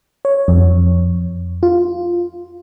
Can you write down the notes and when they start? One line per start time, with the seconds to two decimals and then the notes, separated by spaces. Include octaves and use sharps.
0.25 C#5
0.48 F2
1.63 F4